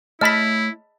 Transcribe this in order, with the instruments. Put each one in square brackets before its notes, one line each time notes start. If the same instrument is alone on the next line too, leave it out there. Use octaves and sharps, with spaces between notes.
[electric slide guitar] A3 C#5 [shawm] E4 [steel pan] D#5 A5 B5 [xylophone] F6 B6